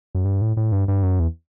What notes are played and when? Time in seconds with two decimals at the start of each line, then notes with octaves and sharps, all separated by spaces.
0.15 F#2
0.25 G2
0.41 A2
0.57 A2
0.72 G2
0.88 G2
1.03 F#2
1.20 E2